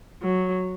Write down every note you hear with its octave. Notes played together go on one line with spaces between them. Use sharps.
F#3